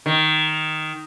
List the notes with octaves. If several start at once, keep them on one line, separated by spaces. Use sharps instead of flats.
D#3